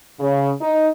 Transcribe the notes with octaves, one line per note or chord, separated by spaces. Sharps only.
C#3
D#4